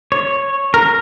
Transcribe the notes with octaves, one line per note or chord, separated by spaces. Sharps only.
C#5
A#4